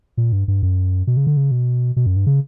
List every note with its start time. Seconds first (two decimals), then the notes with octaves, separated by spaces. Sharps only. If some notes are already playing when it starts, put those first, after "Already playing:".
0.17 A#2
0.32 G2
0.48 G2
0.63 F#2
1.07 B2
1.17 C#3
1.27 D3
1.37 C#3
1.51 B2
1.96 B2
2.06 F#2
2.16 G2
2.26 C#3